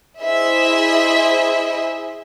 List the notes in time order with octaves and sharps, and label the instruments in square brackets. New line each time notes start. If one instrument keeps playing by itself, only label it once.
[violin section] E4 G#4 C5 D#5 E5